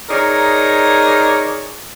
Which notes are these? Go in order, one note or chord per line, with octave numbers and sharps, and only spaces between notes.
D#4 G#4 A#4 C#5 D5